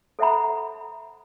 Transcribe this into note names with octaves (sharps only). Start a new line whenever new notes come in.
A4 C5 E5 F#5 A#5 B5